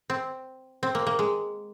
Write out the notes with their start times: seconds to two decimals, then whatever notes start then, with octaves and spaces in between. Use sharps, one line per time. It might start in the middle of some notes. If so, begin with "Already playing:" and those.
0.10 C4
0.83 C4
0.95 A#3
1.07 A#3
1.19 G#3